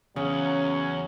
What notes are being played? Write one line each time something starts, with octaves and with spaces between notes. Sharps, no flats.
E2 C#3 F#3 C#4